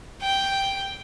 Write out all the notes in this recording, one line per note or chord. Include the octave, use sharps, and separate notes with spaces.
G5